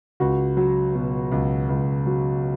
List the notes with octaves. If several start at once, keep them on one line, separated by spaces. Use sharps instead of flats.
C#2 F#4
F#3
B2
C#2
C#2
F#3